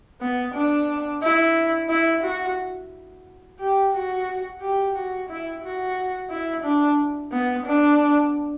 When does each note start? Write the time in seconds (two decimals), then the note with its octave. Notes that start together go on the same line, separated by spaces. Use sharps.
0.21 B3
0.54 D4
1.22 E4
1.89 E4
2.23 F#4
3.60 G4
3.93 F#4
4.61 G4
4.95 F#4
5.29 E4
5.63 F#4
6.30 E4
6.64 D4
7.32 B3
7.66 D4